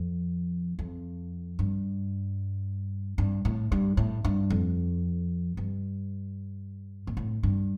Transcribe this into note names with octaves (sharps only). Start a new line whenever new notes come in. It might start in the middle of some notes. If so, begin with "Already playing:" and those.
Already playing: F2
F2
G2
G2
A2
G2
A2
G2
F2
G2
A#2
A2
G2